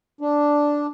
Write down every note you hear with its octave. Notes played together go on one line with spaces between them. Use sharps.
D4